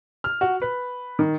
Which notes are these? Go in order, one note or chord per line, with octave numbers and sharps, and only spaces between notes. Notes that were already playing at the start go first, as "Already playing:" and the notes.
F6
F#4
B4
D#3